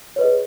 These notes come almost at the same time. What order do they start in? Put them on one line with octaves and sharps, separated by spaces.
C#5 B4 D#5 G#4